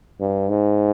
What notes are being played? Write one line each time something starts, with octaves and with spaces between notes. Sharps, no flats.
G2
G#2